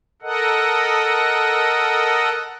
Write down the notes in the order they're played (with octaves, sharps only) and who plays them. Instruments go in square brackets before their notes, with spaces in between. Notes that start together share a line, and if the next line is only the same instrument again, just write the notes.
[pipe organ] A4 A#4 D#5 F#5